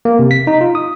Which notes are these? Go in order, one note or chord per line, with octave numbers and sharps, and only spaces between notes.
A#3
C3
B6
D#4
F4
D#6